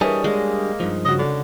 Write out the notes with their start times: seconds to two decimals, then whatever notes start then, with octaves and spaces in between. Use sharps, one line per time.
0.01 E3 G3 D4 G#4 A#4 C#5 D#5
0.24 G#3 A#3
0.80 G2 F3 D#4
1.05 C#3 F#4 D#5
1.19 D3